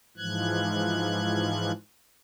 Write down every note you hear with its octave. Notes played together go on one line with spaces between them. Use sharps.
G#2 E3 F3 F#6 G#6